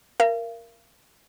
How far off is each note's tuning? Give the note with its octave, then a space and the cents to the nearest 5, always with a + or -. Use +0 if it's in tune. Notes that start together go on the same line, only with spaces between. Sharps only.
A#4 +0 F5 -40